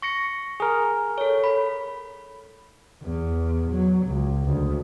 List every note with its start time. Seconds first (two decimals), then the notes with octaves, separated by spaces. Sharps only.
0.02 C#6 A#6 C#7
0.60 G#4 A#4
1.18 A4 C#5
1.44 B5
3.03 E2
3.71 F#3
4.07 C#2
4.45 D2